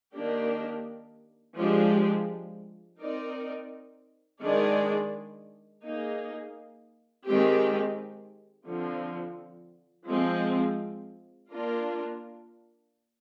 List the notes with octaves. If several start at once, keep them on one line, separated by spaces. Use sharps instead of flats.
D#3 A#3 D4 G4 A#4
F3 G#3 D4 G4
C4 D#4 A#4 D5
D#3 G#3 D4 G#4 D5
A#3 D#4 G#4
D#3 G#3 C4 G4
D3 F3 C4
F3 G#3 C4
A#3 D4 F4 A#4